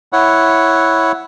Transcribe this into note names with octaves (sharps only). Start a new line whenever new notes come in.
E4 C#5 F#5